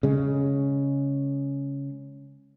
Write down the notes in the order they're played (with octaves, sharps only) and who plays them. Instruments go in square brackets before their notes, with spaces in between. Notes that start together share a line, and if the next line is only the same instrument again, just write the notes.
[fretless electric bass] C#3 G#3